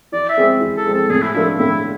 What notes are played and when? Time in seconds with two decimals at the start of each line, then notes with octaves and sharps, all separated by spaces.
0.12 E3 D5
0.29 E5
0.37 G#3 C4 G#4
0.61 E3
0.77 A4
0.86 G#3 C4 G#4
0.94 A4
1.10 A2 G#4
1.22 E4
1.34 F3 A3 D4 E4 F4
1.59 A2 E4